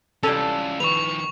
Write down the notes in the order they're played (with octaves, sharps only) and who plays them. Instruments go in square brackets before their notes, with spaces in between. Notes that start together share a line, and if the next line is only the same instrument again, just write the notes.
[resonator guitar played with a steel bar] C3 E3 G3 [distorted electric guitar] C#4 F4 [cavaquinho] A4
[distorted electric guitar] D#3 F3 [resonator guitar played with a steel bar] B4 [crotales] C#6 F7